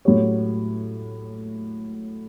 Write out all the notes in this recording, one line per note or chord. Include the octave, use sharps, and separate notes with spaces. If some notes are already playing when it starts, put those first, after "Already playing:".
A2 F#3 C#4 G4 C#5